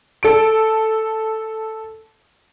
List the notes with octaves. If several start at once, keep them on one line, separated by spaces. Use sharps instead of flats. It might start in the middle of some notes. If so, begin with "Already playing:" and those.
A4 D7